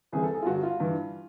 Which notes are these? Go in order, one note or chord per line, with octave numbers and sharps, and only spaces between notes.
C2 C3 E3 G#4
A4
G#4
F4
G2 D3 F#4
F4
G2 E3